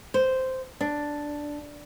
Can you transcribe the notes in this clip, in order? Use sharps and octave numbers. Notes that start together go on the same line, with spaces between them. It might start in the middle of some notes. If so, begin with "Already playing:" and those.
C5
D4